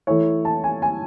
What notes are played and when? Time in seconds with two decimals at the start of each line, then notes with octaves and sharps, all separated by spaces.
0.07 E3 A3 E4 C#5
0.45 A5
0.64 G#5
0.82 G#5